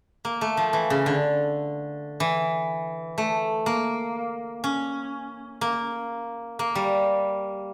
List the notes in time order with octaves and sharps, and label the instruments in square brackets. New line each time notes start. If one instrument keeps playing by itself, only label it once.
[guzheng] A#3
A3
F3
E3
C#3
D3
E3
A3
A#3
C#4
A#3
A#3
G3